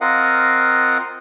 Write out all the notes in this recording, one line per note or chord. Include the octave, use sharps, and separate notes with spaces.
C4 F4 A#4 D#5 F5 F#5